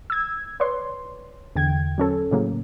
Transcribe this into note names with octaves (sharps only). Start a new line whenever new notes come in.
E6 G#6
B4 C#5 D5 C6
E2 D3 G5 G#6
F#3 C#4 A4
A2 C#3 F#3 A#3